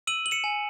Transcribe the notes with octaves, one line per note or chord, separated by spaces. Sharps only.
E6 D#7 F#7
F#7
C#7 E7
G#5